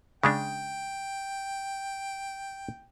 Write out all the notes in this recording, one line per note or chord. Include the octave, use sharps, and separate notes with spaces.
C#3 G#3 D4 G5